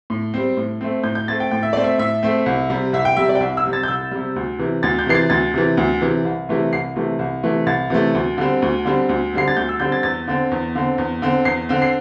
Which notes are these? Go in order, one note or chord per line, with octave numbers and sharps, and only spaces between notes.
A2
G3 C4
A2
A3 C4
A2 G6
G6
A3 C4 A6
G5
A2 G5
E5
A3 C4 D5
E5
A2 E5
A3 C4
C2
C3 G3
C2 E5
G5
C3 G3 E5
D5
G5
C2 E5
E6
C3 G3
A6
G6
C2 E6
C3 G3
D2
C3 E3
D2 A6
G6
C3 E3 C7
A6
D2 A6
C3 E3
D2
C3 E3
C2
C3 E3 A3
C2 C7
C3 E3 A3
C2
C3 E3 A3
C2 A6
C3 E3 A3
D2
D3 G3 C4
D2
D3 G3 C4
D2
D3 G3 C4 C7
A6
D2 G6
E6
D3 G3 C4 G6
A6
E2 A6
D3 C4
E2
D3 C4
E2
D3 C4
E2 C7
D3 C4
C7